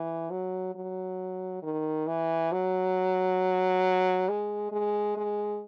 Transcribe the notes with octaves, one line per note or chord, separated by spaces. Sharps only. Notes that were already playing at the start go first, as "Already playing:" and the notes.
Already playing: E3
F#3
F#3
D#3
E3
F#3
G#3
G#3
G#3